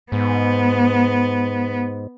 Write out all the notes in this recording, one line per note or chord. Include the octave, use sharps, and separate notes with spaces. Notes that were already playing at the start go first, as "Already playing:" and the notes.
G#2 B3